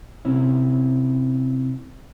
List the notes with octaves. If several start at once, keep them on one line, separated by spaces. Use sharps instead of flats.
C3 C4 C#4 E4